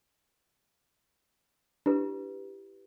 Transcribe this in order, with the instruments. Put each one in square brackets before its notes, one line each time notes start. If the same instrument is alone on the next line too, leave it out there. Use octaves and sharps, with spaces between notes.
[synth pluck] D4 [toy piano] E4 G4 B4